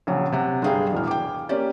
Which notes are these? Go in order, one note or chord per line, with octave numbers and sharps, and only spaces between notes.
A#1 C#3 F#3
C3 F#5
G1 G2 G#4 F5 G5
E1 A2 F6
G5 D6
A#3 C#4 G4 D5